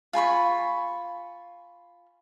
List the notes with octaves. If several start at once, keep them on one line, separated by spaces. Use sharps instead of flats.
F4 G#5 B5 C#6